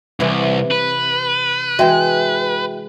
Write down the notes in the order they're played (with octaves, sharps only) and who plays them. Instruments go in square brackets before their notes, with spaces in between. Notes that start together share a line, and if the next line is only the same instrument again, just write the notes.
[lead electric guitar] C2 G#2 [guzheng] C3 E3
[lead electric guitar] B4
[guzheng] E3 G#3 [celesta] F#4 E5 G5